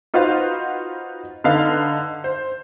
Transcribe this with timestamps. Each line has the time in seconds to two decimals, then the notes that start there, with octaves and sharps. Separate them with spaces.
0.14 D#4 F4 F#4 B4 C5 F5
1.44 D3 D#4 B4 F5
2.24 C5